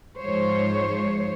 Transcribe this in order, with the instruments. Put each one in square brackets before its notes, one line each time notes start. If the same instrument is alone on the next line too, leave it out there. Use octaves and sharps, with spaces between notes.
[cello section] G#2 F3 C5 C#5